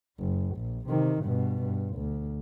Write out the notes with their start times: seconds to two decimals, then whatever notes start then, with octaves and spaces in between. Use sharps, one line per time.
0.20 F#1
0.56 A#1
0.88 C3 D#3
1.23 G2 B2
1.63 G2
1.96 D2